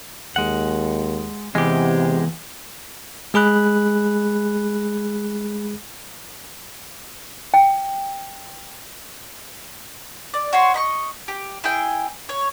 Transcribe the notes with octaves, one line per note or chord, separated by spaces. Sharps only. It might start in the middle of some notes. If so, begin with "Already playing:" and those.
D#2 G#3 F#5
E2 C3 G#3 G4
G#3 G#4 B5 F#6
G5
D5
F#4 C#5 C6
D#5 B5 C#6
G4
E4 G#4 G5
C#5